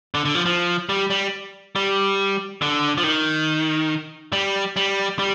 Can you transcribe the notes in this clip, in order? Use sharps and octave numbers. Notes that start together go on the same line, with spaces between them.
D3
D3
F3
F3
G3
G3
G3
D3
F3
D#3
G3
G3
G3